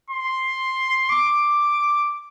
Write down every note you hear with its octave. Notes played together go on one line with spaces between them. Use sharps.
C6
D6